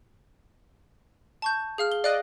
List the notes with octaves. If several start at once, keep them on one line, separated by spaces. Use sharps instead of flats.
A5 C#6 G6
G#4 F5 F6
G7
D5 D#5 F5 F#6